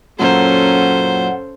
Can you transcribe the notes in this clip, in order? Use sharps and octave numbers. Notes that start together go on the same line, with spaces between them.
F#2 A#2 F#3 C#4 A4 C5 F#5